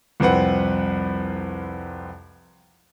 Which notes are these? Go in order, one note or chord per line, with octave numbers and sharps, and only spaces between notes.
C2 F2 C4 B4 F#5